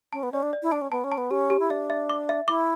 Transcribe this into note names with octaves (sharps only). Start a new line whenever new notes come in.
C#4 A5
B3
C#4 D5
D4
D5
E4
D4 A5
C#4
B3 A5
C#4
A5
B3
C#4 G4
G4
E4
D4 E5
E5
D6
E5
E4 D6